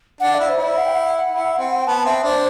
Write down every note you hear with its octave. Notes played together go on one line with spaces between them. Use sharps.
D4 F#5
E4 D5
C5
E4 D5
F#5
G5
F#5
E4
C4
G5
B3 A5
C4 E5
D4 C5